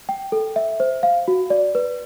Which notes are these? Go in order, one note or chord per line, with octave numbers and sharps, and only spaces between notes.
G5
A4
E5
C5
F5
F#4
D5
B4